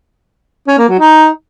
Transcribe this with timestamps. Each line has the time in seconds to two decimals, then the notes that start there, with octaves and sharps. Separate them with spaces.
0.68 C#4
0.78 A#3
0.89 F#3
0.99 D#4